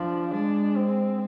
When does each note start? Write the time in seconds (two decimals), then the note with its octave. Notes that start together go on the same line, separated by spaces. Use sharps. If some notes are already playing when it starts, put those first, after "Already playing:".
Already playing: F3 D4
0.31 G#3 D4
0.75 C4